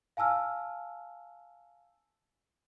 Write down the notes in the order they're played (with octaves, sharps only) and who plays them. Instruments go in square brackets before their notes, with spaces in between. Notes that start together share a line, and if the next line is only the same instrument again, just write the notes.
[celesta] F5 G#5 A5 E6 F6